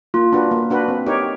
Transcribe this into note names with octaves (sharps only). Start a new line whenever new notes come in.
A#3 F4
D4 F#4 B4
A#3
D4 F#4 B4
C4
D#4 G4 A#4 C#5